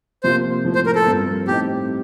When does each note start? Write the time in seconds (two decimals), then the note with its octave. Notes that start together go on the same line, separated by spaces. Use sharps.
0.23 C3 F3 A#3 F4 C5
0.64 A2 F3 A3
0.75 C5
0.86 A#4
0.95 A4
1.06 G2 F3 C4
1.48 A2 G3 C4 D#4 G4